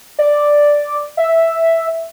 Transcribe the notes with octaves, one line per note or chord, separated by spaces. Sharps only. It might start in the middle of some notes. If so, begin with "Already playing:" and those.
D5
E5